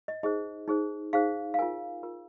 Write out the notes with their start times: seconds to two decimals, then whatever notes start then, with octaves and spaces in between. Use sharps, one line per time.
0.08 D#5
0.23 D#4 G#4 C5 D#5
0.68 D#4 G#4 C5
1.13 D#4 G#4 C5 F5
1.54 F5
1.59 F4 A#4 G#5
2.03 F4 A#4